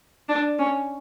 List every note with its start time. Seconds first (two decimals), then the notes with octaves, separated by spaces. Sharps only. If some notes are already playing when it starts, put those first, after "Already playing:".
0.29 D4
0.59 C#4